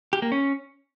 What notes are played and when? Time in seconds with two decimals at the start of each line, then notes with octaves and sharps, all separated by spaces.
0.13 G4
0.22 A#3
0.32 C#4